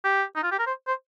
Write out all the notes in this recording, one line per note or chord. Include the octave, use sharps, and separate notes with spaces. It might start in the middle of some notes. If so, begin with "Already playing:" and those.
G4
D#4
F4
G4
A#4
C5
C5